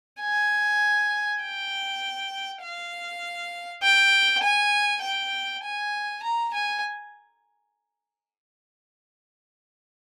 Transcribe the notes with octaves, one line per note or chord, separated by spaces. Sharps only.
G#5
G5
F5
G5
G#5
G5
G#5
A#5
G#5